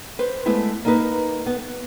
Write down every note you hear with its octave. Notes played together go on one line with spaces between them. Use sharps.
B4 C5
G#3 A3 B3 E4
A#3 D#4 B4
B3
B3